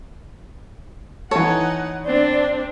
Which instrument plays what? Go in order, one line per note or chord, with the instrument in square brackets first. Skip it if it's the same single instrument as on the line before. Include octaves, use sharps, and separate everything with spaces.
[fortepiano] E3 A4 [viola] D#4 F#5 [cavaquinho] C#5
[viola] C4 D4 [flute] D5